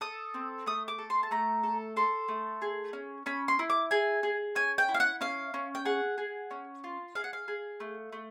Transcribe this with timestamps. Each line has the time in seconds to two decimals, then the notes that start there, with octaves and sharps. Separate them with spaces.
0.01 A4 D#6
0.34 C4
0.66 A3 D#6
0.88 D6
0.98 A4
1.10 C6
1.23 A5
1.31 A3 A#5
1.63 A4
1.96 A4 C6
2.28 A3
2.62 G#4
2.93 C#4
3.26 C#4 B5
3.48 C6
3.59 E4
3.70 D6
3.91 G#4 G#5
4.23 G#4
4.55 C#4 G#5
4.78 G5
4.89 E4
4.94 F5
5.00 F#5
5.21 C#4 F5
5.54 C#4
5.75 G5
5.85 G#4 F#5
6.18 G#4
6.51 C#4
6.84 F4
7.15 G#4 F5
7.24 F#5
7.33 F5
7.48 G#4
7.80 A3
8.12 A3